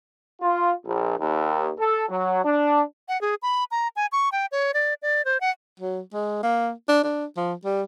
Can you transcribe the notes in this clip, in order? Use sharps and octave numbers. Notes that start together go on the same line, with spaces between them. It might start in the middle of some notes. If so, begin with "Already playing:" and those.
F4
A#1
D#2
A4
F#3
D4
F#5
G#4
B5
A#5
G#5
C#6
G5
C#5
D5
D5
C5
F#5
F#3
G#3
A#3
D4
D4
F3
G3